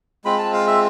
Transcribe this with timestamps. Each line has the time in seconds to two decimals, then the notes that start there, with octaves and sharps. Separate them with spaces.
0.25 G#3 C4 F4 B5
0.38 A5
0.53 F5
0.67 E5